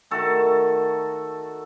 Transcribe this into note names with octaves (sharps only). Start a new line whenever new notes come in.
D#3 A3 D#4 F#4 A4